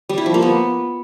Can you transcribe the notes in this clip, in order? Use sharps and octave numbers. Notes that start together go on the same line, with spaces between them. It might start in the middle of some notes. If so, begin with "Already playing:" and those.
G3
E4
F3
A#3
B3